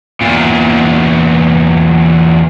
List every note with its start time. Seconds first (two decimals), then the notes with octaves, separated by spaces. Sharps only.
0.21 E2 A#2